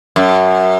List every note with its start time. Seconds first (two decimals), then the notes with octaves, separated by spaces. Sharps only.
0.16 F#2